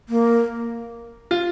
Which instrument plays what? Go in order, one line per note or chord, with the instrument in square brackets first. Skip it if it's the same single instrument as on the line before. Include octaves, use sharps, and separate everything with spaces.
[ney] A#3
[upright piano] F4